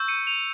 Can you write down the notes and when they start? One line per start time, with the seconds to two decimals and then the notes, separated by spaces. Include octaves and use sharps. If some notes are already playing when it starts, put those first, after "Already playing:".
Already playing: C#6 E6 G6
0.08 C#7 D#7
0.27 D#7 F7